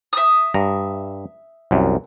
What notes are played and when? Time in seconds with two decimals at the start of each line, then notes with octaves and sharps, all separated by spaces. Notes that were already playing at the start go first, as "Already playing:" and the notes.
0.13 E5 D#6
0.54 G2 A#5
1.71 C2 F#2